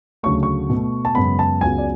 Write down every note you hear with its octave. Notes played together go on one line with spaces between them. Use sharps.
D2 C#3 F#3 A3 C#6
C#6
B2 A3
A5
F#2 C#3 G#3 B3 B5
A5
C#2 C#3 F#3 B3 G#5
D5